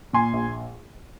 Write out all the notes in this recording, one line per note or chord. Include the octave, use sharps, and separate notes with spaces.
A#2 G#5 C6
A#1